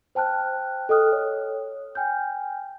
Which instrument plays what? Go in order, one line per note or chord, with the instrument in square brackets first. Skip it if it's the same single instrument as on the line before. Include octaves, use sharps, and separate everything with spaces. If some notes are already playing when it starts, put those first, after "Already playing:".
[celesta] C5 G5 A5 F6 F#6
A4 D#5 G5 D#6 F6 F#6
C#5
G5 G#5 F6 G6